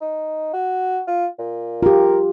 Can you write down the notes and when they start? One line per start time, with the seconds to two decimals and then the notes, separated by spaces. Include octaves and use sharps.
0.01 D#4
0.53 F#4
1.07 F4
1.39 A#2
1.83 F4 G4 A#4